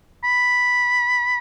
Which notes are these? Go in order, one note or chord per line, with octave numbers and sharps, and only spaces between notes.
B5